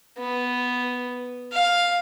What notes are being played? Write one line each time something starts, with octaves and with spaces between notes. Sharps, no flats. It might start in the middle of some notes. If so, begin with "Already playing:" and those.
B3
F5